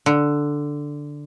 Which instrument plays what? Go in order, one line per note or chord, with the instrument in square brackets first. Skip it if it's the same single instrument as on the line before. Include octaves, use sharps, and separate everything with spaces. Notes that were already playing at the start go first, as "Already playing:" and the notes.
[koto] D3